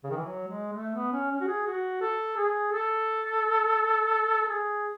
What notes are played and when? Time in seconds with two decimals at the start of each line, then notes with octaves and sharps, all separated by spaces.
0.04 C#3
0.10 D#3
0.17 E3
0.25 F#3
0.48 G#3
0.72 A3
0.95 B3
1.13 C#4
1.31 C#4
1.41 F#4
1.48 G#4
1.66 F#4
2.01 A4
2.37 G#4
2.72 A4
4.49 G#4